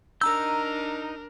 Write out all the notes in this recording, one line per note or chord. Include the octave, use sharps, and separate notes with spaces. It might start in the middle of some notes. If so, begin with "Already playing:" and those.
D4 D#4 A#4 A#5 E6 G6